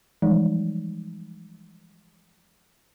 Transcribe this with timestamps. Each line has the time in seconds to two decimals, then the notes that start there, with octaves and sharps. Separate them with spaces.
0.22 E3 F3 G3 G#3 D#4